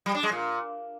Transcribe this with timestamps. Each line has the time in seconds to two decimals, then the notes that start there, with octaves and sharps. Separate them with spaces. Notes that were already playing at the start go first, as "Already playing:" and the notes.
0.06 G3
0.15 D4
0.23 G#3
0.32 A#2